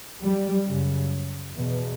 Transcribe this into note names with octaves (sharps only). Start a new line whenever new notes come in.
G3
F#2 C#3
E2 B2